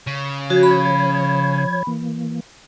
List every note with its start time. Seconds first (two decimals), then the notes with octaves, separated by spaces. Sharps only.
0.07 C#3
0.50 F3 F#4 C#5 G#6
0.63 B5
1.87 E3 A#3